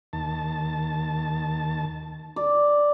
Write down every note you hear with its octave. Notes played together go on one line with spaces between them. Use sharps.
D#2 A5
D5